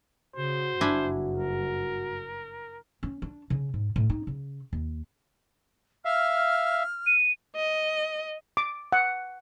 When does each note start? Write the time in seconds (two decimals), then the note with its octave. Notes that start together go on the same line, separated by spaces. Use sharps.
0.36 C#3 F#4 C5
0.81 F#1 G2 D4 E4 G#5
1.38 A#4
3.03 C#4
3.22 D4
3.50 C#3
3.74 G#2
3.96 A2
4.10 D#4
4.27 C#3
4.73 D#2
6.05 E5 F5 F6
7.06 D#7
7.56 D#5
8.57 D6
8.92 F#5